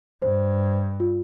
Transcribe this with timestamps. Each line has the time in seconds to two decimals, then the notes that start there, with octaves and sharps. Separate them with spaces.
0.22 G2 C5
1.00 F4